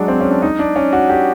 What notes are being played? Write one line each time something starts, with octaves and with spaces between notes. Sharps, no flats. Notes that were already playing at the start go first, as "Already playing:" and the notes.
Already playing: F#3 G#3 D4
C4
C#4
D4
D#4
D4
C#4
F#4
G4